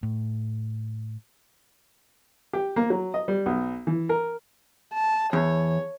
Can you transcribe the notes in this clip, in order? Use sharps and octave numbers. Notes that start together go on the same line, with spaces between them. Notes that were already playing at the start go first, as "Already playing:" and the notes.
A2
G4
A#3
F#3
D#5
G3
B1
E3
A#4
A5
E2 C#5